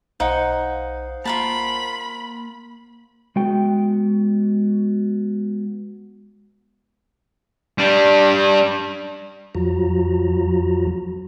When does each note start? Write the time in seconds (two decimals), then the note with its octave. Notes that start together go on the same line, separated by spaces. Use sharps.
0.20 B1 D#4 C5 F5 F#5
1.25 A#3 F4 A#4 A5 B5
3.36 G#3 B3 F#4 G5
7.78 G3 D4
9.55 F2 F3 F#3 F4 F#4 A#5